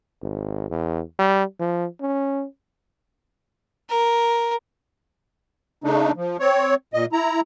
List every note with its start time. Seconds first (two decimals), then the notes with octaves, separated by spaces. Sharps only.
0.22 G#1
0.70 E2
1.19 G3
1.60 F3
2.01 C#4
3.89 A#4
5.84 C#3 A3 D4 D#4
6.16 F3
6.40 C4 C#5
6.94 A#2 D#5
7.13 E4 A#5